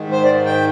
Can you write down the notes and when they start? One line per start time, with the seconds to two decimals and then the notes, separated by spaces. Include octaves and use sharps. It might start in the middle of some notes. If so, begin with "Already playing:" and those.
Already playing: G#2 D#3
0.12 C5
0.24 D5
0.46 G5